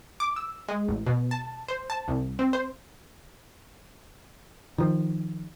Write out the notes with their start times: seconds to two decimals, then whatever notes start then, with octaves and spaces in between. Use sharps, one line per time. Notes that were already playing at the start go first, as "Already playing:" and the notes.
0.20 D6
0.36 E6
0.68 G#3
0.88 A1
1.07 B2
1.31 A5
1.68 C5
1.90 A5
2.08 C2
2.39 C4
2.53 C5
4.78 D#3 F3